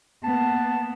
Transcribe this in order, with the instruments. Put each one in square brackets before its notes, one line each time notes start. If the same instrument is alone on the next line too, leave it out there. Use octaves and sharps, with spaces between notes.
[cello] A#3 B3 [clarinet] A5